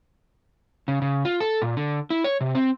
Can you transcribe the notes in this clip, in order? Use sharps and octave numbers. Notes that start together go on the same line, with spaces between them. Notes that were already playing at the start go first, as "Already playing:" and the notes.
C#3
C#3
F4
A4
A#2
D3
E4
C#5
C3
C4